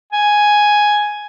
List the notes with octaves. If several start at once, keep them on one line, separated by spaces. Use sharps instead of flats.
G#5